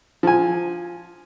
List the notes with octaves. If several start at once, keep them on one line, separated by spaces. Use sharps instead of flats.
F3 G#5